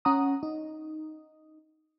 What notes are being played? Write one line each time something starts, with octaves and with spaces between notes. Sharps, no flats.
C#4 F#5 A#5 D#6
D#4